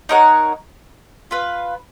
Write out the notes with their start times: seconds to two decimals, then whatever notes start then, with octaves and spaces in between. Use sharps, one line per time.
0.09 D#4 A#4 C#5 F#5
1.31 F4 B4 F5